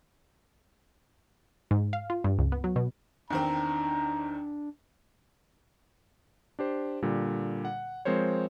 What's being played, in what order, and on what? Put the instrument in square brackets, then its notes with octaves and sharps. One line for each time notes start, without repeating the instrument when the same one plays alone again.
[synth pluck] G#2
F5
F4
G2
C#2
B3
F#3
B2
[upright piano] E2 D#3 C4 [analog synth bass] D4 [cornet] A#5
[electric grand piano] D4 G4 C5
A#2 D3 G3
F#5
F3 G#3 C4 A#4 C5 C#5